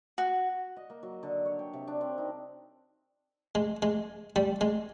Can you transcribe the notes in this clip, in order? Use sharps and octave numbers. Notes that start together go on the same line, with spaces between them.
F#4
D#5
A#3
F#3
D3
C#5
G5
C3
D4
C4
D#4
G#3
G#3
G3
G#3